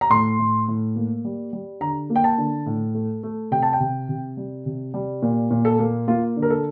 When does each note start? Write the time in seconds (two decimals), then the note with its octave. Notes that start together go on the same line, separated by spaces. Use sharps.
0.01 A#5
0.10 A2 C6
0.39 A2
0.68 A2
0.96 A#3
1.25 G3
1.53 G3
1.81 D3 A#5
2.10 A#3
2.16 G5
2.24 A5
2.38 D3
2.66 A2
2.95 A3
3.23 A3
3.51 C3 G5
3.63 A5
3.73 G5
3.80 C3
4.09 C3
4.37 G3
4.66 C3
4.94 G3
5.22 A#2
5.51 A#2
5.65 A4
5.79 A#3
6.08 A#3 F4
6.36 D3
6.42 A#4
6.50 A4